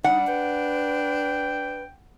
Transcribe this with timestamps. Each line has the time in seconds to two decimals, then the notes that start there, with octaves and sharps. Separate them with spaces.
0.04 G3 D4 D#4 F#5
0.27 B4 G5